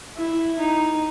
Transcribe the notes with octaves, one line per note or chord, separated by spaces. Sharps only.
E4
D#4